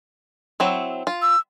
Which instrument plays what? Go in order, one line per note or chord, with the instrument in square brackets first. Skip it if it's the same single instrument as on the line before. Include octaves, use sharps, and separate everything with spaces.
[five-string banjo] F#3 C4 E4
F4
[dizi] E6